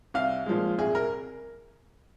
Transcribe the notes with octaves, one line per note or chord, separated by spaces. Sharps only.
C2 F5
A#2 F3 G#3
C2 G#4
A#4